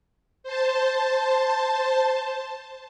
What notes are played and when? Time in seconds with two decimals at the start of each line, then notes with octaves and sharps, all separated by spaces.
0.43 C5 A5